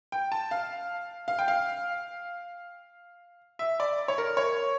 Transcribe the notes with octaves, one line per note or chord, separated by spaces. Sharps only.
G5
A5
F5
F5
G5
F5
E5
D5
C#5
A#4
C#5